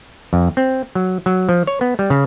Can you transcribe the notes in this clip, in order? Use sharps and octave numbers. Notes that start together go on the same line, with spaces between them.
F2
C4
F#3
F#3
F3
C#5
B3
G3
C#3